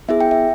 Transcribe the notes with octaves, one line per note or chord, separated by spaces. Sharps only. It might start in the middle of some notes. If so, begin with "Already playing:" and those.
B3 E4 G#4 E5
G5
E5